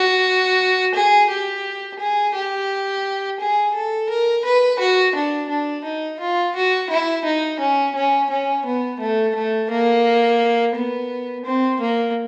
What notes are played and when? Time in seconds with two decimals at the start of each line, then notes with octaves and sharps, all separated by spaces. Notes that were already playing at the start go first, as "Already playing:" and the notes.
Already playing: F#4
0.95 G#4
1.30 G4
1.99 G#4
2.35 G4
3.40 G#4
3.74 A4
4.10 A#4
4.45 B4
4.80 F#4
5.15 D4
5.49 D4
5.84 D#4
6.20 F4
6.55 F#4
6.90 E4
7.25 D#4
7.60 C#4
7.95 C#4
8.30 C#4
8.65 B3
9.00 A3
9.35 A3
9.70 A#3
10.75 B3
11.45 C4
11.80 A#3